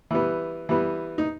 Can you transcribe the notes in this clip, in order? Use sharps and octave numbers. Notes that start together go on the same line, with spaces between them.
E3 G3 B3
E3 G3 B3
D#4